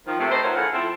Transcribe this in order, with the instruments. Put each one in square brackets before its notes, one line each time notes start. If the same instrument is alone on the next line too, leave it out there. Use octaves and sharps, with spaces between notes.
[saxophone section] D#3 F3
C3 A3
D#4 A4 B4 C5
D#3 F#3 A3 F4 B4 C#5
A2 C#3 F5 F#5
F3 C4 E4 A4